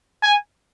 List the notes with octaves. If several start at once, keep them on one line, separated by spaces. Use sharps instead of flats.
G#5